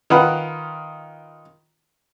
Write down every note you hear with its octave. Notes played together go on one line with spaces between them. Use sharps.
D#3 F4 B4 F#5 B5